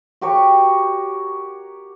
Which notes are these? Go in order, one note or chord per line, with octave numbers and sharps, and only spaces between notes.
F#4 G4 A#4 C#5